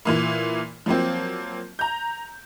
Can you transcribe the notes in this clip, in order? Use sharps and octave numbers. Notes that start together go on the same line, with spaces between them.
A#2 E3 A#3
F3 F#3 A#3 C4
A#5 G6